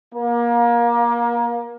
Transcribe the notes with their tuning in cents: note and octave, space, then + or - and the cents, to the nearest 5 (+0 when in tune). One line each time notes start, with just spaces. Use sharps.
A#3 +25